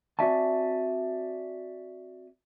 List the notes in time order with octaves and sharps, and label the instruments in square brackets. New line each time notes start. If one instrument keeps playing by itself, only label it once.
[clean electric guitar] C4 F#4 D5 E5 G#5 A5